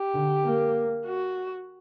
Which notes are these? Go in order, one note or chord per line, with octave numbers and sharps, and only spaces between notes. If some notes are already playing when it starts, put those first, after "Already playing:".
Already playing: G4
D3
A#3
F#4